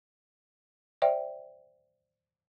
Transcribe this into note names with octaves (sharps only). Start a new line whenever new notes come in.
C5 D5 E5 G5